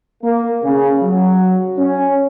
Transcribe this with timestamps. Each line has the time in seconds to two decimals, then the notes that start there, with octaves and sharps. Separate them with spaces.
0.24 A#3
0.64 C#3
1.02 F#3
1.78 C#4